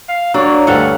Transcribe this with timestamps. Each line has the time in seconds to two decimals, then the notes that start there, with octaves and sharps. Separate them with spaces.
0.09 F5
0.34 F#3 A#3 D4 C#5
0.67 D2 G2 A4 F5 F#5